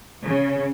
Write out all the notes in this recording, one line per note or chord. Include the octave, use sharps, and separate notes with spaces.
C#3